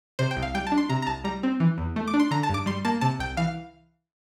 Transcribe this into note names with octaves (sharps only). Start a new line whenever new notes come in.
C3 C5
G5
C2
F5
G3 G5
A5
D4
C6
C3 A#5
A#5
C2 A5
G3 A#5
C4
E3
E2
A3
D6
D4
C6
D3 A#5
A5
G2 D6
G3 C6
A#3 A5
C3 A5
C2 G5
E3 F5